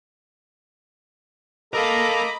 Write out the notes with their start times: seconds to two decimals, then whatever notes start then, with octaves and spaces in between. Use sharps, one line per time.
1.73 A4 A#4 D#5 F5 A#5 B5 D6